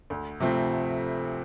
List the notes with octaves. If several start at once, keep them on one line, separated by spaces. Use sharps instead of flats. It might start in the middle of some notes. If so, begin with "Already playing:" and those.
D2
C3 F3 A3 C4